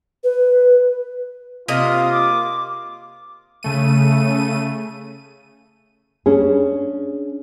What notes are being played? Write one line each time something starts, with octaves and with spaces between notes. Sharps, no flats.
B4
C3 A#3 F4 D#5 D#6
D6
C#3 A3 D#7
C#4 D4 G#4